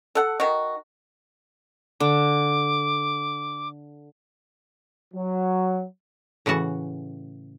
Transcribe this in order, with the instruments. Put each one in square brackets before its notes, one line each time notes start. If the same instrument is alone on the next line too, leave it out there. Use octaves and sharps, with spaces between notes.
[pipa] A4 F#5
D#3 F#4
[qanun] D3 [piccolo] D6
[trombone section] F#3
[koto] A2 C#3 E3 F#4 A5